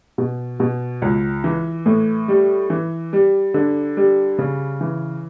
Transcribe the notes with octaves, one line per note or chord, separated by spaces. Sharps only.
B2
B2
C#2
E3
A2
G3
E3
G3
D3
G3
C#3
E3